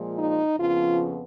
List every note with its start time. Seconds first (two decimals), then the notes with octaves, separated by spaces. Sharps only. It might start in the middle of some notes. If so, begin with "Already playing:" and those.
Already playing: A#2 F3 G#3
0.18 D#4
0.58 F2 C#3 F3 B3 F4